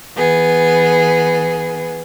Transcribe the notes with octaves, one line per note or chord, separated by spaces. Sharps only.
E3 B3 G#4